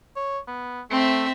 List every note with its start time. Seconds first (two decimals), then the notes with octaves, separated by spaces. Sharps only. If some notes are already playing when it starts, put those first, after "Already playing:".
0.16 C#5
0.47 B3
0.91 A3 C4 E5